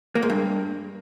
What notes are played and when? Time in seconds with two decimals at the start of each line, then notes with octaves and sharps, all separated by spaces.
0.15 A#3
0.22 G#2
0.30 G2